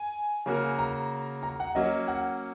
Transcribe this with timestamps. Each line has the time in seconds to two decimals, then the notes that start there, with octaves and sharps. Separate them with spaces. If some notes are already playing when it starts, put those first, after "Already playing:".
Already playing: G#5
0.46 C#3 A#3 F#4 A#4
0.78 A#5
1.43 A#5
1.60 F#5
1.75 F#3 A#3 C#4 D#5
2.08 F#5